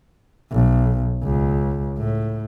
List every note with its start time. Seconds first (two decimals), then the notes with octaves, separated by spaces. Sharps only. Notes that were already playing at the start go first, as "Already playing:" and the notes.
0.52 B1
1.24 C#2
1.98 A2